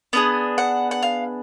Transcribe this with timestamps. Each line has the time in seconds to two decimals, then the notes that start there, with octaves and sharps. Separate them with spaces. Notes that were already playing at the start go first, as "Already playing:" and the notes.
0.13 B3 D4 G#4 D#6
0.58 F#5
0.91 F#5
1.03 F5